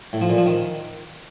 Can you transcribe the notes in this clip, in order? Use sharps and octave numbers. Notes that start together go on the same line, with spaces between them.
A2
F3
A#2
F3
D#3